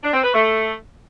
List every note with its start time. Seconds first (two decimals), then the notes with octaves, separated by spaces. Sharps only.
0.03 D4
0.13 C4
0.24 B4
0.34 A3